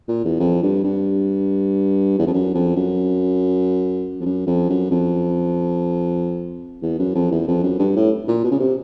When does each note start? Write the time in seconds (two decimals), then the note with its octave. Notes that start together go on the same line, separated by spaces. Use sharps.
0.08 A#2
0.25 E2
0.40 F2
0.63 G2
0.84 G2
2.19 E2
2.27 F2
2.33 F#2
2.55 F2
2.76 F#2
4.20 F2
4.26 F#2
4.47 F2
4.70 F#2
4.91 F2
6.82 E2
6.99 F#2
7.15 F2
7.32 E2
7.47 F2
7.63 F#2
7.79 G2
7.96 A2
8.28 A#2
8.44 B2
8.51 C#3
8.60 C3